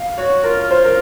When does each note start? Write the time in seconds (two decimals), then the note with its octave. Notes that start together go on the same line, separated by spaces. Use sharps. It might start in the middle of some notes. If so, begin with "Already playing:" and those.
Already playing: F5
0.17 F#4 C#5
0.44 F4 A#4
0.71 C5
0.85 A#4